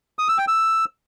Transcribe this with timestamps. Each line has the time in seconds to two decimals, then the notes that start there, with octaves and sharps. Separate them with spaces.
0.19 D#6
0.28 E6
0.38 G5
0.48 E6